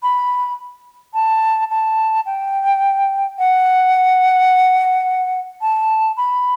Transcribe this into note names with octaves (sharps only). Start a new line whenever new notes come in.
B5
A5
A5
G5
F#5
A5
B5